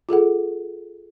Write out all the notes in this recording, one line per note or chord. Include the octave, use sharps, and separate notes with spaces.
F4 G#4 A4 F#5